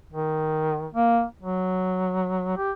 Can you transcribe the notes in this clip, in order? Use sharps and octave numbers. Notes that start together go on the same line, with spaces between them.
D#3
A#3
F#3
G4